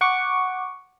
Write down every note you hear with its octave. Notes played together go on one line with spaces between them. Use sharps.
F#5 C#6 D6